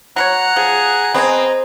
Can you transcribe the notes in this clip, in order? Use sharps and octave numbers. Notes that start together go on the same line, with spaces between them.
F#3 A#4 C#5 F#5 A#5 F#6
F3 G#4
B3 C4 G#4 D#5 A#5